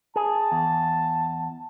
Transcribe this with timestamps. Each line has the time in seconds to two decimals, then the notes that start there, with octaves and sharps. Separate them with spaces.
0.16 G#4 A5
0.52 E2